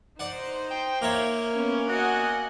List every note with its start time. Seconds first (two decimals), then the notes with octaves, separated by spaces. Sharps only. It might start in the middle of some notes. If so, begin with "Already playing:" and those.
0.19 D#4 C5 D5 F#5
0.71 G5
1.02 A#3 C#5 E5 A#5
1.53 B3 C#4
1.89 F#4 D#5 F#5 G#5